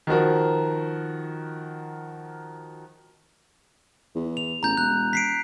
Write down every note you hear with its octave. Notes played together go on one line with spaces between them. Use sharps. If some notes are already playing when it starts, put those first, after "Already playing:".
D#3 F3 F#4 A#4
E2
F7
A1 A#5 G6
E1 F#6
B6 C7 D7